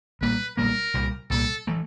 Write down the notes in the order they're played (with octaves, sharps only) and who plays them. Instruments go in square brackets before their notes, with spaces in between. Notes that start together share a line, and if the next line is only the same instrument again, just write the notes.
[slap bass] B1 A#2 G3 A#3 [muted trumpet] B4
[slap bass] B1 A#2 G3 A#3 [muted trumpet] A#4
[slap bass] C2 A#2 G3
[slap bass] C2 A#2 G3 [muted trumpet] A4
[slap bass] E3 A3